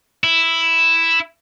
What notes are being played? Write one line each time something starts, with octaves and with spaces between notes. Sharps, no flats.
E4